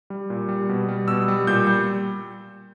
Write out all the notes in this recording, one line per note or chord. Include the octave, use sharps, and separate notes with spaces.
G3
A#2
G3
B2
G3
B2 E6
G3
A#2 G6
G3